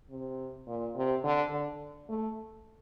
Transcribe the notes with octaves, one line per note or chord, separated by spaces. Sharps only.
C3
A#2
C3
D3
D3
A3